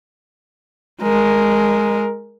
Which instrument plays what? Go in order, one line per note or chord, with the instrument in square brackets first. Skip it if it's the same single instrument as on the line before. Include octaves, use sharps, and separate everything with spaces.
[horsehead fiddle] G#3 A#4